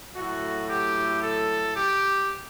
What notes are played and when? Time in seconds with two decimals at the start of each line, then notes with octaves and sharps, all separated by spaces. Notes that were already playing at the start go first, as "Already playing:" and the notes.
0.14 A2 F#3 A3 F#4
0.68 G4
1.22 A4
1.75 G4